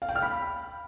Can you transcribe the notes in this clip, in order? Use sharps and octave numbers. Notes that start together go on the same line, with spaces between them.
F5
G5
F6
B5